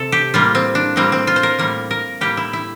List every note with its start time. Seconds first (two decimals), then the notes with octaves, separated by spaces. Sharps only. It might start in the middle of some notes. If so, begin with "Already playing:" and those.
Already playing: C3 A4
0.12 G4
0.34 A2 G3 A#3 F4
0.55 C4
0.75 D4
0.96 A2 G3 A#3 C4
1.12 C4
1.27 F4
1.36 C5
1.43 A#4
1.59 A2 G3 A#3 A#4
1.91 A#4
2.21 A2 G3 A#3 G4
2.37 E4
2.53 E4